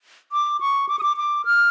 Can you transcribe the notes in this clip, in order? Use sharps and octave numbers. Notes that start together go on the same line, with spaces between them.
D6
C#6
D6
D#6
D6
D6
F6